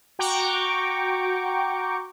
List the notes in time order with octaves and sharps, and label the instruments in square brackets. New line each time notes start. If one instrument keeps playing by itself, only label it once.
[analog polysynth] F#4 G5 A#5 C#6 D6